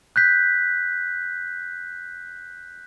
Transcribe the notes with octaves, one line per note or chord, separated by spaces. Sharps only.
F#6 G6 B6